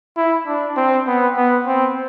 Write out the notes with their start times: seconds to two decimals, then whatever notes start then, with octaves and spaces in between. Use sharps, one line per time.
0.17 E4
0.47 D4
0.76 C4
1.07 B3
1.37 B3
1.67 C4